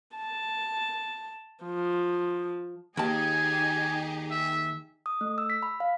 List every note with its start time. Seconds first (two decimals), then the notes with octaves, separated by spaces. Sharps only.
0.17 A5
1.65 F3
2.97 D#2 D#4 G4 G#4 G#5 A5
4.31 E5
5.06 D#6
5.21 A3
5.38 E6
5.50 B6
5.63 B5
5.80 F5